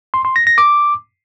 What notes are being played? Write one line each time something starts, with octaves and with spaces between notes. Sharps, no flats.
C6
C6
A#6
A#6
D6